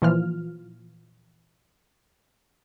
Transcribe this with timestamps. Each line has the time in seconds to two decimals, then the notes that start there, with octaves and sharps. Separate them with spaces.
0.02 A#2 E3 F3 F4 F6